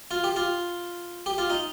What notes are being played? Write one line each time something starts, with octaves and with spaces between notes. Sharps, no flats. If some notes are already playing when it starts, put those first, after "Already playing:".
F4
G4
F4
G4
F4
D#4